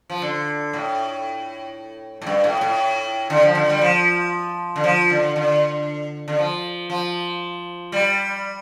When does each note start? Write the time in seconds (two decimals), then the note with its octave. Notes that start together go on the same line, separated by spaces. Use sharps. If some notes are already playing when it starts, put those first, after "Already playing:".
0.10 F3
0.22 D3
0.73 A2
2.22 A2
2.27 G2
2.44 A2
2.61 A2
3.30 D3
3.43 F3
3.55 D3
3.70 G3
3.81 F3
4.76 D3
4.84 F3
5.10 D3
5.36 D3
6.28 D3
6.39 F3
6.90 F3
7.92 G3